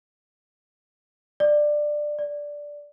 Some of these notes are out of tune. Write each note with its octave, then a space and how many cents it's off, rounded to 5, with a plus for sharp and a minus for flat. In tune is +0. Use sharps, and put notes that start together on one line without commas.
D5 +15
D5 -5